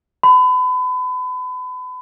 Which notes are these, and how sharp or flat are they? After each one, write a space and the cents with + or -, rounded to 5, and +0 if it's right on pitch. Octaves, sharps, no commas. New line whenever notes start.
B5 +35